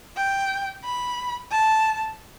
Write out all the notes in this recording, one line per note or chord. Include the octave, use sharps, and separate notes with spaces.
G5
B5
A5